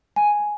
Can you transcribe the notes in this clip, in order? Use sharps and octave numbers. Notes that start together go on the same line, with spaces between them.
G#5